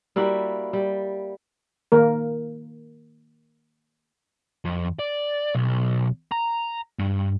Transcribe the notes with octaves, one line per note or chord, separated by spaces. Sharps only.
G3 A#3 E4 F#4
G3
D#3 A#3 A#4
F2
D5
B1
A#5
G2